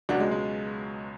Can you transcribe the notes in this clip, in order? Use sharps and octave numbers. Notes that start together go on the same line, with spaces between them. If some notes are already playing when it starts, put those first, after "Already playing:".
C#2 B2 F#3 C#4 D4 F#4
G#3
G#3